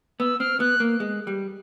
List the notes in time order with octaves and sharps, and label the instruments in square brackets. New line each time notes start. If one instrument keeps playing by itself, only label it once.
[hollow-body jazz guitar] B3 [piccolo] E6
[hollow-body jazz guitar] C4 [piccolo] F6
[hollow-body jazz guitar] B3 [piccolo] F#6
[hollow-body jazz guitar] A#3
G#3
G3